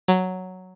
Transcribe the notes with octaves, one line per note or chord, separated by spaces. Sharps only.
F#3